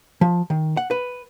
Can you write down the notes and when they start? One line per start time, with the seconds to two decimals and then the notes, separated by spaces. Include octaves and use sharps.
0.21 F3
0.50 D#3
0.77 F#5
0.91 B4